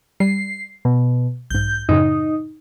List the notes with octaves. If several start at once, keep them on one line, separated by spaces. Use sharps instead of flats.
G3 C7
B2
B1 G#2 G6
F#2 A2 C#3 D#4